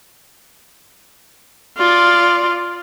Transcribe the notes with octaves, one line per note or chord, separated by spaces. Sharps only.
F4 D5